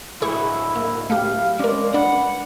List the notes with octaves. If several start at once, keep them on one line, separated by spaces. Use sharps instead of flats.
A2 F#3 E4 G#4 C#6
A#3
A3 G4 F5
G#3 C#4 A#4 D5
D4 B4 F#5